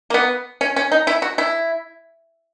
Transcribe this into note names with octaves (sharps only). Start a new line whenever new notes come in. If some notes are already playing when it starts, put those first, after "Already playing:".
A#3
B3
C#4
C#4
D#4
E4
F#4
E4